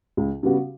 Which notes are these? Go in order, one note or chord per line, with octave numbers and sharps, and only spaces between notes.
C#2
C#3 G3 B3 F#4